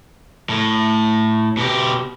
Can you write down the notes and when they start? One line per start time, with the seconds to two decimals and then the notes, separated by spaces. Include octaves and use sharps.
0.49 A2
1.57 B2 G4